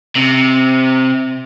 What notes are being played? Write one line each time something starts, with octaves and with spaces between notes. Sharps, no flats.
C3